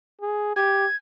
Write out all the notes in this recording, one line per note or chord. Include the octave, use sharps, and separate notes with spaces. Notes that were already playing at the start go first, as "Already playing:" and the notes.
G#4
G4 G#6